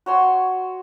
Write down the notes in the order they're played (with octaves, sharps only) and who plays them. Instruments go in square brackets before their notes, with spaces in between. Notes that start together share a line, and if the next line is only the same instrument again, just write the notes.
[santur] F#4 C#5 C6